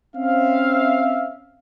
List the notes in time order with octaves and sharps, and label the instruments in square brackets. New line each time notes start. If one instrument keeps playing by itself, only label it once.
[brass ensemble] C4 C#4 E5 F5